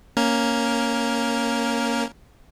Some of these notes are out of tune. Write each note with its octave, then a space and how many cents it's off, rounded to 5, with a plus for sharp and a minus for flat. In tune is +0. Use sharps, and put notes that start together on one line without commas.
A#3 +0 C#4 +0 A#4 +0